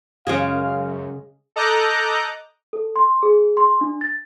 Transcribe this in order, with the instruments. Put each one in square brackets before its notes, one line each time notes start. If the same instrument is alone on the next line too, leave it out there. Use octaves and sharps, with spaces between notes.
[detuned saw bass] F#2 [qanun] C#3 G#3 G#4 [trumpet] F5
[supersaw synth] A4 D#5 A#5 D6 F#6 G6
[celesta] A4
C6
G#4
C6
D4
A6